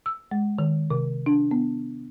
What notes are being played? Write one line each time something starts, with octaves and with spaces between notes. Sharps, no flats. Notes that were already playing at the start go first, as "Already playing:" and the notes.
E6
G#3
D#3
C3
D4
B3